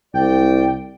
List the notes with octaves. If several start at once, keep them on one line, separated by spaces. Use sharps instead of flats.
C2 D5 G5